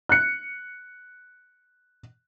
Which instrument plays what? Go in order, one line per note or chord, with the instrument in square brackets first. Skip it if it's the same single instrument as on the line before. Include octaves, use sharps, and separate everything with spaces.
[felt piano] F#6 C#7